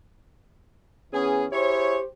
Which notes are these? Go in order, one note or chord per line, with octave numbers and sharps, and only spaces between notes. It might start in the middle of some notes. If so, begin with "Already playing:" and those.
E3 B3 C#4 G#4
E4 G4 G#4 C5 C#5